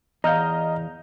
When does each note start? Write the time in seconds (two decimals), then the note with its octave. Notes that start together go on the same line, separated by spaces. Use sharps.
0.24 E2 D#5 F5 A#5 F6 G6